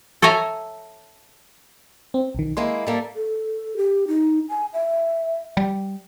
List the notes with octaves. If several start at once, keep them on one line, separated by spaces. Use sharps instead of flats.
A4 C#5 E5 G#5 A#5
C4
B1 D#3
G#3 A#3 E4 C6
G3 A#3 A4
A4
G4
D#4
G#5
E5
G3